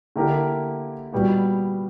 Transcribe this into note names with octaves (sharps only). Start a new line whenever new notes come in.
D3 A#3 E4 G4 A#4
A#2 G3 B3 F#4